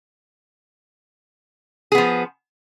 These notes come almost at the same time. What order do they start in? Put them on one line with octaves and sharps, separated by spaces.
G#4 B3 F3